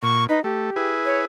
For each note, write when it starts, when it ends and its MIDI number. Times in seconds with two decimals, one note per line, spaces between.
0.03 0.27 46
0.03 0.24 85
0.29 0.43 63
0.29 0.40 71
0.44 0.70 57
0.44 0.90 67
0.76 1.25 64
0.76 1.25 68
0.76 1.25 71
1.05 1.18 73